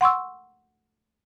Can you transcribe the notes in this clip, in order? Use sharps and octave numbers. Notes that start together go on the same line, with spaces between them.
F#5 C6 C#6 E6